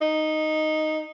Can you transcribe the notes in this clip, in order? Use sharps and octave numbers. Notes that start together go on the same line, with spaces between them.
D#4